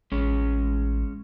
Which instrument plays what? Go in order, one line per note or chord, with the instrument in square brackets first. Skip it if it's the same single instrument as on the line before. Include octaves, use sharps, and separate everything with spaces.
[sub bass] A1 [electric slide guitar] G#3 C#4